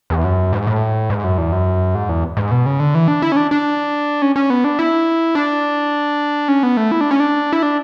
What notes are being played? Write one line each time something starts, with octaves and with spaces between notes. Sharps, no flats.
E2
F#2
G#2
A2
G#2
F#2
E2
F#2
G#2
E2
G#2
B2
C#3
D3
E3
D4
E4
C#4
D4
D4
C#4
C#4
B3
D4
E4
D4
C#4
B3
A3
E4
D4
C#4
D4
E4
D4